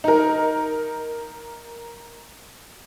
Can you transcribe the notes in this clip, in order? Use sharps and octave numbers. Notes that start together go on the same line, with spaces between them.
D#4 A#4